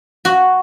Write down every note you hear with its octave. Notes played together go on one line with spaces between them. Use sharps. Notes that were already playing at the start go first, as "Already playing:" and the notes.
F#4